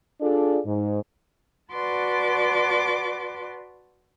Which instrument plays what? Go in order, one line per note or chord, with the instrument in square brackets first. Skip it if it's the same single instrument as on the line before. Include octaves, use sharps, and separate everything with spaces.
[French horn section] D4 F4 G#4 A4 D5
G#2
[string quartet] F#4 B4 D5 A5 C6 D6